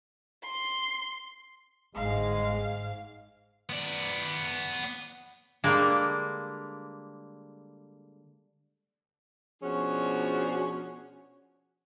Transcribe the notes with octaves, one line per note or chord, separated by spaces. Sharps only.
C6
G1 G#2 G#3 F5
B3 D5
D3 G3 G#3 A#3
B2 F3 C#4 D4 F#4 G#4